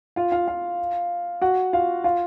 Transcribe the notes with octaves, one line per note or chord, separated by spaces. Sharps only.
F4 F5
F4 F5
F4 F5
F#4 F#5
F4 F5
F4 F5